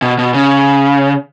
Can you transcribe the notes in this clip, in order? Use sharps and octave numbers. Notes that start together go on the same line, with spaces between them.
B2
B2
C#3